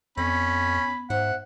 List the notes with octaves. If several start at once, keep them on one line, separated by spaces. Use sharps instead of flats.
F2 B3 C#4 B5
G#2 C5 E5 F#5